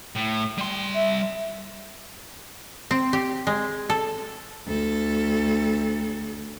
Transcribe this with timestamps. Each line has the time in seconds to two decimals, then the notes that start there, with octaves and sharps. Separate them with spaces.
0.15 A2
0.58 G3 C6
0.95 E5
2.91 C4
3.13 G4
3.47 G#3
3.90 A4
4.66 D2 A4